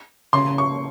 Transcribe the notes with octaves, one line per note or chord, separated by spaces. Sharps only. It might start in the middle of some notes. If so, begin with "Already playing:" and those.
C#3 C6
C#6